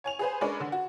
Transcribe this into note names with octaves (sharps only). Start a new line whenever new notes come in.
C#5 G#5 F7
G#4 B4 C5
G#3 C#4 D4 A#4 B4 C#5
D3
F#4